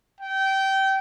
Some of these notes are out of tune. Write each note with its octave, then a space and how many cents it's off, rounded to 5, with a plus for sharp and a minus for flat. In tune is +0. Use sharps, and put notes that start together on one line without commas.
G5 -20